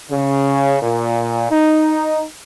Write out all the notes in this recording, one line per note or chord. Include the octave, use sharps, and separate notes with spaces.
C#3
A#2
D#4